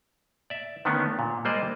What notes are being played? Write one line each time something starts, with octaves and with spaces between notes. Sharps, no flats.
D5 E5
D3 D#3 A3 B3 C#4 D4
A#2
G3 G#3 A#3 C5 D5 D#5